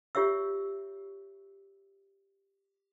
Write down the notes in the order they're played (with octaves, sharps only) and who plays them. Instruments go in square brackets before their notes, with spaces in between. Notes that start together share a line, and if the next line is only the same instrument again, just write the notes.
[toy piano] F4 G4 C#5 E5 E6